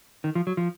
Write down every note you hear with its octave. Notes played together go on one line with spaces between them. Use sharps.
D#3
F3
F#3
F3